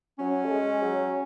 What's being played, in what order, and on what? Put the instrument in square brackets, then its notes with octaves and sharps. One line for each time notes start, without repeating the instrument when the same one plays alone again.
[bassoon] F#3 [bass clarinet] C#4
[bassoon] A3
G#3
F#3